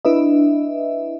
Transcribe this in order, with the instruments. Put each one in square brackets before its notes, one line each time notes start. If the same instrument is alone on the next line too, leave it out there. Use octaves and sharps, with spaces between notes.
[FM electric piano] D4 E4 B4 D#5 E5